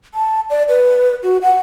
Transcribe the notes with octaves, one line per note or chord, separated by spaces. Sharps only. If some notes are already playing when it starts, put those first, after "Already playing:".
A5
D5
B4
F#4
F#5